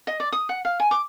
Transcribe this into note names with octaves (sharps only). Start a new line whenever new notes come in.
D#5
D5
D#6
F#5
F5
G#5
D6